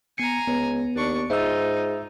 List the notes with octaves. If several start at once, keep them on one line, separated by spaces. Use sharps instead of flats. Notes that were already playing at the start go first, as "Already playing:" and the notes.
B3 G#5 A#5 C7 C#7
C#2 B3
D#2 D4 C#6
G#2 D#4 F4 E5 E6